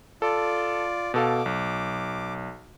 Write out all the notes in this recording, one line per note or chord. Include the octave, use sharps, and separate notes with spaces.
F4 A4 D5
B2 A4 F5 D6
B1